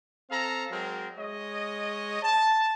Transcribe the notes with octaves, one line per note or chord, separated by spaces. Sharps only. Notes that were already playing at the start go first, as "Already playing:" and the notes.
C4 A4 F5 A#5
F#3 G#3 C4 A#4
G#3 C#5 D#5
A5